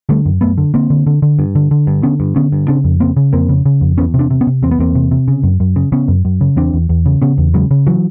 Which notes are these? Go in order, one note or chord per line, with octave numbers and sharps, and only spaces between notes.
D3 G3 A3
F#2
F#2 A3 B3
D3
D3 A#3 C4
D3
D3
D3
G2
D3
D3
G2
D3 B3 C#4
G2
D3 B3 C#4
G2
C#3 C4 D4
F2
C#3 A#3 C4
C#3
F2 A#3 C4
C#3
C#3
F2
E2 B3 C#4
C3
C4 D4
C3
B3 C#4
C3
E2 C4
B3
E2 A#3 C4
C3
C3
C#3
F#2
F#2
C#3
C#3 B3 C#4
F#2
F#2
C#3
E2 C4 D4
E2
E2
C#3
C#3 B3 C#4
E2
C#3 F#3 G#3
C#3
E3 F#3